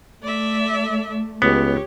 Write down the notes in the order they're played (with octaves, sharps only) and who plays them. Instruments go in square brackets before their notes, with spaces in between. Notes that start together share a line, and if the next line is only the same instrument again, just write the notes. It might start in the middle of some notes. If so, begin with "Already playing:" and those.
[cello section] A3 [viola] D5 E5
[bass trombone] C#2 [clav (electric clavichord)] B3 [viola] G4 C#5